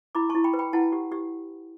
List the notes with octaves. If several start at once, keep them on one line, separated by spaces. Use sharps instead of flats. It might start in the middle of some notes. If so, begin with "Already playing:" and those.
E4 B5 D6
E4 A5 C#6
G5 B5
B4
G5 B5
E4 F#5 A5
G4
G4